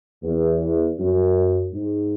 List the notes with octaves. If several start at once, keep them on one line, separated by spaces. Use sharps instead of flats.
E2
F#2
G#2